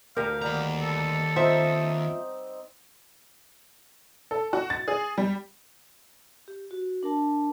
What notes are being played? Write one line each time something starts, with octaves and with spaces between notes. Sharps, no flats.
D2 G4 A#4 F5
D#2 G3 F#5 A#5
A4
C4 D#4 F4 C5 E5
A4
F#4
A6
G#4
G3
G4
F#4
D4 A#4 A5